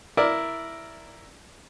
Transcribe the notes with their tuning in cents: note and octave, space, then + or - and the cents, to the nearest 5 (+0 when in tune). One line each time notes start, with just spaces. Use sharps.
E4 +0 A#4 +0 D5 +0